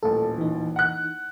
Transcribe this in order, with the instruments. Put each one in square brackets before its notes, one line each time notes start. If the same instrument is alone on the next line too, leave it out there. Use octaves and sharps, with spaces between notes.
[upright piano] D#1 A1 [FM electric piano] A4
[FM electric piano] E3 D#4
[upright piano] F#5 F#6